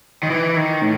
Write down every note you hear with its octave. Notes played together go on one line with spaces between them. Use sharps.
D#3
E3
D#3
A2